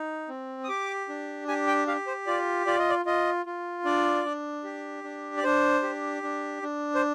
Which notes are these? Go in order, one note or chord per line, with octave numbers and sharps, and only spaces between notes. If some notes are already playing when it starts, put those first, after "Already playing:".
Already playing: D#4
C4
D#6
G4 D6
D4
G4 G#5
G5
G4 F5
C5
F4 D5
F4 D5
D#5
D5
F4 D#5
F4
D4 D5
D4
G4
D4
D5
D4 C5
G4
D4
D4
C5